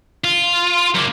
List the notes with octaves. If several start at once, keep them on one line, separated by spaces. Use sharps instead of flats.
F4
F#2 A#3